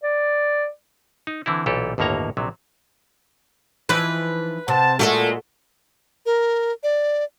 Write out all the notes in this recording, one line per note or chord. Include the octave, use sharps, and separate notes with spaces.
D5
D#4
D3 E3 C4 E4
B1 A#2 E3 G4 A4
G1 D#2 A2 A#3 C#5 A#5
A#1 C3 F#3
E3 F3 D#4 B4
C3 C5 F#5 A5
A#2 G#3 A3 F#4 G4 A4
A#4
D5